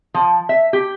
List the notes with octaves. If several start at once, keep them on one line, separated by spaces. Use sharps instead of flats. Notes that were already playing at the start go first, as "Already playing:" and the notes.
F3
E5
G4